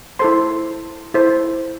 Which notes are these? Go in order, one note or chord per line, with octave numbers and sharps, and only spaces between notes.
E4 A4 C5 C6
E4 A4 C5